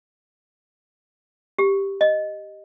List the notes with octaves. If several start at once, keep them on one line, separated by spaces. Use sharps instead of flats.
G4
D#5